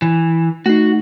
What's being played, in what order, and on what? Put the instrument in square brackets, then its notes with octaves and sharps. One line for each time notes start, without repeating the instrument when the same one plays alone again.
[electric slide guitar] E3
[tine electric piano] A3 D#4 [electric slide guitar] F#4